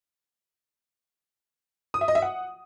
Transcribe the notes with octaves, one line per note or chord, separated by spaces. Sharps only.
D#6
E5
D#5
E5
F#5